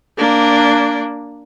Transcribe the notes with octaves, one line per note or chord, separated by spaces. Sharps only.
A#3 D4